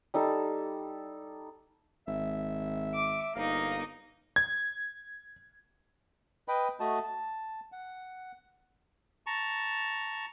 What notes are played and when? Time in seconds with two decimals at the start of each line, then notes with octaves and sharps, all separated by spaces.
0.14 G3 D#4 A4
2.07 G#1 E5
2.94 D6
3.35 G1 A#3 D#4 F5
4.36 G#6
6.48 B4 D#5 G5 B5
6.80 A3 F#4 D#5 A5
7.04 A5
7.72 F#5
9.26 A5 A#5 C#6